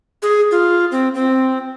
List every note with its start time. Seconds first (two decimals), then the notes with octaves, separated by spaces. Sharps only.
0.22 G#4
0.51 F4
0.92 C4
1.15 C4